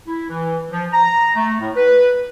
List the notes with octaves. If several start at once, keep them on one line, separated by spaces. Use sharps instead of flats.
E4
E3
F3
A#5
A3
A2
B4